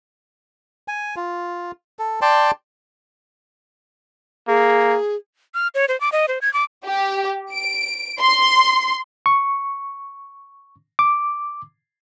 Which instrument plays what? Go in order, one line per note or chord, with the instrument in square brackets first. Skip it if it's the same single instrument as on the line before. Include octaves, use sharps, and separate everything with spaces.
[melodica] G#5
F4
A4
D5 G5 A5 C6
[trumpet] A#3 [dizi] G#4
[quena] F6
C#5
C5
D6
D#5
C5
G#6
D6
[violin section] G4
D7
C6
[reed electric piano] C#6
D6